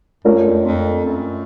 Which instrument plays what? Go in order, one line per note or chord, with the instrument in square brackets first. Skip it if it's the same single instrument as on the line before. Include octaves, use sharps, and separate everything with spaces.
[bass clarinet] F#2 [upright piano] A3 D4 F4 A#4 C#5
[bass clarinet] F2
F2
F#2